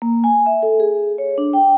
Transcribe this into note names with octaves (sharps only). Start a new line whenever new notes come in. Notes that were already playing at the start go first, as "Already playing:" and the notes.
A#3
G#5
E5
A4
G#4
C#5
D4
G5